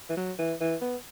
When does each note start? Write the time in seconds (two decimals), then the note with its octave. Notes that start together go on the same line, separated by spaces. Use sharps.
0.10 E3
0.17 F#3
0.39 E3
0.60 E3
0.81 B3